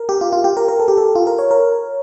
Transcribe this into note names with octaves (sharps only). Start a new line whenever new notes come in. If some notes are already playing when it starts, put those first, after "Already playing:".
Already playing: A#4
G4
F4
F4
G4
A#4
A#4
A4
G4
A4
F4
A#4
C#5
A#4